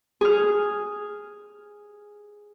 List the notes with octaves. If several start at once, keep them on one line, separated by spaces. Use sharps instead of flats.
G#4 F6